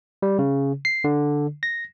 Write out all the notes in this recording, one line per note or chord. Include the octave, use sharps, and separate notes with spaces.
G3
C#3
C7
D3
A#6